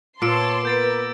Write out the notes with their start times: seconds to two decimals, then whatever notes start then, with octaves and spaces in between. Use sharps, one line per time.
0.22 A#2 B3 C#5 A5 C6 D6 E6 D7
0.65 B3 A#4 B4 G6 A6 D7